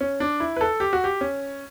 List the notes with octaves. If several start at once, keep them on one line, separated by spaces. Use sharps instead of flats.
C#4
D4
E4
B4
A4
G4
F#4
G4
C#4